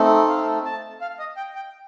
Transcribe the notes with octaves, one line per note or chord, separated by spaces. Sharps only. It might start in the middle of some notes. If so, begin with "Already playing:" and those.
Already playing: A3 C4 D#4 A4
F5
A5
F5
D#5
G5
G5